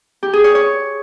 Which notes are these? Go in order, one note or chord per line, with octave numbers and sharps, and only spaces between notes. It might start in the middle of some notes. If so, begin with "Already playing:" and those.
G4
G#4
C#5
C#5